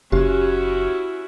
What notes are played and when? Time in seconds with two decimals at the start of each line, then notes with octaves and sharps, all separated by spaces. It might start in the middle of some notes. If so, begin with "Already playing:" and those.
0.12 F#1 C#4 E4 F#4 G4